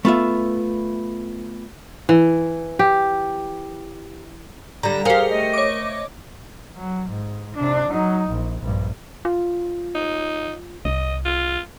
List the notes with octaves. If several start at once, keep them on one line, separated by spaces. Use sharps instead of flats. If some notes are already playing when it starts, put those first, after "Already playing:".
A3 B3 F4 E5
E3
G4
D3 G3 A#5
G4 G#4 A#4 C5 F5 C#7
A3 D#5
C#5 D6
F#3
G#2
C3 D4
F#3 D#4
A#1
A#1 G2
F4
D#4
C2 D#5
F4